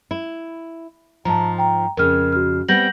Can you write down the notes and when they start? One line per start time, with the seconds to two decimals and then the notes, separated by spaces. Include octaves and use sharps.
0.11 E4
1.25 G#2 F3 A5 A#5
1.58 G5 A#5
1.97 F2 C#3 A#4 F6
2.33 F#4 F6
2.68 G3 B3 C4 G6 A#6 F#7